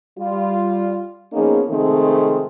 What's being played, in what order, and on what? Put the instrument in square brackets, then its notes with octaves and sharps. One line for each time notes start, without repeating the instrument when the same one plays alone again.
[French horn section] G3 F4
F3 A#3 B3 C#4 D#4 G#4
C3 D#3 F3 G#3 A3 C4